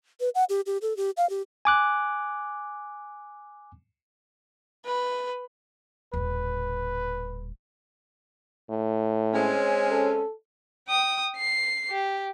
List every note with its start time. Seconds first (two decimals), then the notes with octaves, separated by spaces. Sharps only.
0.20 B4
0.35 F#5
0.49 G4
0.66 G4
0.82 A4
0.97 G4
1.17 F5
1.30 G4
1.65 G#5 D6 F#6
4.86 B4
6.13 D#1 A2 B4
8.70 A2
9.34 G#3 C4 C#4
9.91 A4
10.88 G5 D#6
11.37 C7
11.90 G4